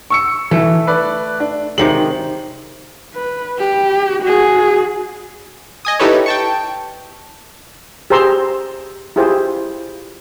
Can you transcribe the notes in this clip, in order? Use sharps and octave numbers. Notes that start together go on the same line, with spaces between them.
C#6 E6 C#7
E3 A3
B4 D5
D4
C3 D#3 G#3 F#7
B4
G4
F#4 G#4
D#5 G#5 D#6
D#4 E4 G4 A4 B4 C#5
G5 A5 C#6
G4 G#4 C5 A#5 C6 E6
E4 F4 G4 G#4 C5